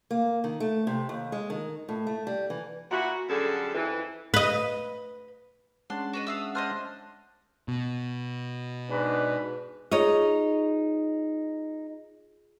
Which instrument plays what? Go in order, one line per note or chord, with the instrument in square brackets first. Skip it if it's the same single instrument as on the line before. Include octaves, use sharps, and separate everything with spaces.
[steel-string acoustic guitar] A#3
D#3
A3
C3
D#2
G#3
D#3
A2
A3
G3
E3
[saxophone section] A#2 E4 F#4
F#2 D3 G3 G#4 A4
F2 E3
[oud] B4 D#5
[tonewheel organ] G#3 C#4 F#5 [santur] D4 A5 [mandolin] C6
[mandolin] F#4 B4 D#5
[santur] E5 [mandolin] F5 D#6 E6
[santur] D4 C5 [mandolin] D#5 D#6 F6
[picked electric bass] B2
[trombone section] G#2 D4 B4
[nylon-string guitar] D#4 C#5 D#5 [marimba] F4 G#4